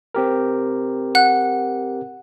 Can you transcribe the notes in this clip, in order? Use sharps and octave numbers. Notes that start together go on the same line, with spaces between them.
C4 G4 A#4
F#5 F#6